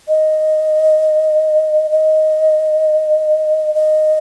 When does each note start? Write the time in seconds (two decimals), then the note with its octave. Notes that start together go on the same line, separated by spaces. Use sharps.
0.08 D#5
1.91 D#5
3.74 D#5